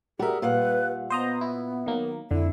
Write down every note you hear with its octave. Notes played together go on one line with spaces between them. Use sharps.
G3 F#4 G#4 A#4 E5
A#2 B4 F5 F#5
B3 C5 D#5 A#5
E4
D#3 F#3 A#3
F2 D3 E4